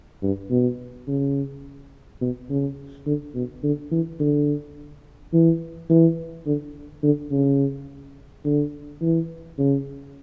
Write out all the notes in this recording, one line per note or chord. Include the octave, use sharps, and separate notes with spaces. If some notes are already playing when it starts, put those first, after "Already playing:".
G2
B2
C#3
B2
C#3
D3
B2
D3
E3
D3
E3
E3
D3
D3
C#3
D3
E3
C#3